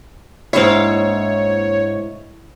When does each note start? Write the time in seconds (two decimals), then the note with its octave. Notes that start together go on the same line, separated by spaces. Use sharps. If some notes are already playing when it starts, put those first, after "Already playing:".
0.53 G#2 A#3 D4 E4 C5 C#5 F5